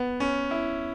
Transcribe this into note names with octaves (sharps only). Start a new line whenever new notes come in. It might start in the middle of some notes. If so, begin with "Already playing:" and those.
Already playing: B3
C#4
E4